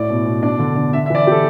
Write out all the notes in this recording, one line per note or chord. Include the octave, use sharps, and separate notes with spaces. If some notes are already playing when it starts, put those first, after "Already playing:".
Already playing: A2 E4 D5
B2
B2
D4 D5
D3
D3
D4 E5
E5
E3 D5
E5
E3 G4 A4